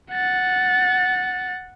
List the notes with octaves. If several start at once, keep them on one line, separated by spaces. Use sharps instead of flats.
F#5 A6